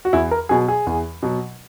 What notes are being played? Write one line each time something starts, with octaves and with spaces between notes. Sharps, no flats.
F#4
E2 E4
A#4
B2 F#3 G#4
G#4
E2
B2 F#3